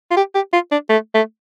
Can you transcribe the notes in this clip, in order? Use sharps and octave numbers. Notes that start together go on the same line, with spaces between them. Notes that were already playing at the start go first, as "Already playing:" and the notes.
F4
G4
G4
F4
D4
A3
A3